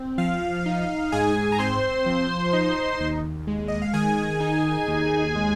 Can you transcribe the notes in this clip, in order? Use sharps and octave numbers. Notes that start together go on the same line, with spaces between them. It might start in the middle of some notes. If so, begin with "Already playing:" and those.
Already playing: C4
F3 F5
D#4
G#2 G#4 G#5
A#5
C4 C5 C6
F3
D#4
D#2
G#3
D#5
F5
D#3 G#4 G#5
D#4
D#2
G#3